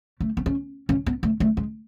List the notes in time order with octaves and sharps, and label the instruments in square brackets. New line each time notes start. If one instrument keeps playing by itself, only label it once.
[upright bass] A3
B3
C#4
C#4
B3
A3
A3
G#3